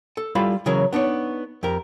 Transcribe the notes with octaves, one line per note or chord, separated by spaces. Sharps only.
A4
G3 E4 F4 A4 F5 B5
C#3 E3 F#3 C#4 G#4 A#4
B3 D4 D#4 C#5
F2 G4 A#4